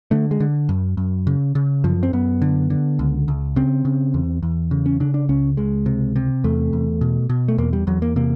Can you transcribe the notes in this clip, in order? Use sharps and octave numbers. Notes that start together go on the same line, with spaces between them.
D3 A3
G#3
D3
F#2
F#2
C#3
C#3
F#2 F3
C4
F#2 B3
D3
D3
C#2
C#2
C#3 C4
C#3
E2
E2
C#3
C#4
C#3 D4
D4
C#2 C#4
C#2 G#3
C3
C3
E2 A3
E2
B2
B2
A3
E2 A#3
G3
E2 F#3
A#3
C3 A#3